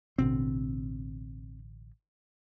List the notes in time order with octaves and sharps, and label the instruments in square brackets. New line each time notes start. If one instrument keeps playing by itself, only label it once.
[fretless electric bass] A1 B2 D3 [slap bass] C4